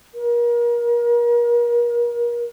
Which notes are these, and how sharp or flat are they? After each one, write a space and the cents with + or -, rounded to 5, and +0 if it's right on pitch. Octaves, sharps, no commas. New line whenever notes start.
A#4 +35